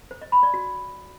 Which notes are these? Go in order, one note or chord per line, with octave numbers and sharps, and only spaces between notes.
C5
D#5
B5
D5
F#4